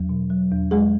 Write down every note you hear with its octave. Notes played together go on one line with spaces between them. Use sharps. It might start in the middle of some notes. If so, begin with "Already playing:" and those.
Already playing: E2 F#3
B2
F#3
E2
E2 G#3 G#4